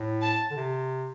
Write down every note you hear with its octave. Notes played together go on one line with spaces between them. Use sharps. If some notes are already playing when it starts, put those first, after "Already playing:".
Already playing: A2
A5
D3
C3